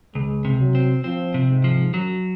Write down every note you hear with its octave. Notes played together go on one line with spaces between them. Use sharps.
C#2 G#3
C3
F#3
C4
F3 C4
C3
G#2
F3
F#2 F#3